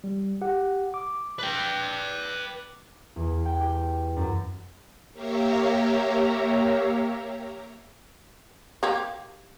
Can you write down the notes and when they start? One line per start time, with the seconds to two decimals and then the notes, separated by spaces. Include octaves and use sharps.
0.04 G3
0.41 G4 F#5
0.94 D6
1.39 B4 G5
3.16 E2
3.45 G5
3.60 G4
4.16 F#2
5.13 A#3 G4 C#5 E5 F5 A#5
8.83 A#3 G4